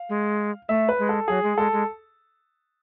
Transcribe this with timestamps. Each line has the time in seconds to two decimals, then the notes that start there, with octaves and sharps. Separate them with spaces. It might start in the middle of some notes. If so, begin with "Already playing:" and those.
Already playing: F5
0.09 G#3
0.69 A3 E5
0.89 B4
0.99 G#3
1.09 A4
1.28 F#3 G#4
1.43 G#3
1.57 G#3 A4
1.73 G#3